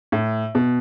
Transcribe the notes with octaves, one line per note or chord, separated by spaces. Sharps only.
A2
B2